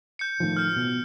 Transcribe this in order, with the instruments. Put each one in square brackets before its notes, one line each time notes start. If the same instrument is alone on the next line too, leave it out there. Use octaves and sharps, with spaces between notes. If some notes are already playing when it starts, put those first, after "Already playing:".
[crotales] G6 C#7
[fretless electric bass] A2 D#3 F3
[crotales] F6 G6
[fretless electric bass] B2